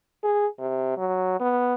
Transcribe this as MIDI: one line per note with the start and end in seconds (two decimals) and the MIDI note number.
0.23 0.46 68
0.59 0.93 48
0.97 1.36 54
1.40 1.75 59